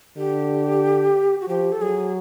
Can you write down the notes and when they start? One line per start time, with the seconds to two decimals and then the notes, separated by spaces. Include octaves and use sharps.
0.17 D3 G4
1.41 F#4
1.48 F3 G4
1.72 A4
1.82 F#3 G#4